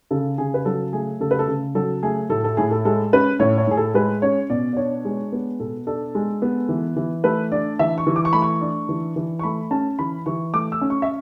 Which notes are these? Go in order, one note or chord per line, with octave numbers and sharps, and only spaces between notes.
C#3 A4
C#3 G#4
B4
F#3 A4
A3 G#4
C#3 A4
B4
A4
C#3
F#3 A4
A3 G#4
A2 A4
A4
A2 G#4
A4
G#3 A4
C#4 B4
A2 C#5
C#5
A2 G#4
A4
G#3 B4
C#4 C#5
B2 D5
D5
D4 C#5
G#3
B3
B2 A4
D4 A4
G#3
B3
E3
E3
A3 B4
D4 D5
E3 E5
C#6
E3
D6
C#6
A3 B5
C#6
D4
E3
E3
C#6
A3 B5
C#4 A5
E3 B5
E3 C#6
A3 D6
E6
C#4
C#6
E5